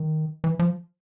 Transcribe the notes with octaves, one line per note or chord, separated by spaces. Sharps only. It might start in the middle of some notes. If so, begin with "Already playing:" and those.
Already playing: D#3
E3
F3